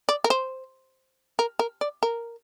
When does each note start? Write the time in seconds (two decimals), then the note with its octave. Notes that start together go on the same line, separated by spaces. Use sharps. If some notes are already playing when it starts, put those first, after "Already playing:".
0.09 D5
0.24 A#4
0.30 C5
1.39 A#4
1.59 A#4
1.81 D5
2.03 A#4